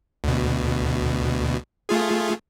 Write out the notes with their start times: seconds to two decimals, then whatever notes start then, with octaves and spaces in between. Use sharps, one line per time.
0.24 D2 B2
1.89 A3 F4 G#4